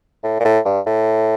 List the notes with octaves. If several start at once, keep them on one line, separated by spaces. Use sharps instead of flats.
A2
A#2
A2
G2
A2